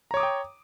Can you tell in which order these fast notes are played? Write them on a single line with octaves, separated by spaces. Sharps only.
A#5 C#5 D6 D#6 G5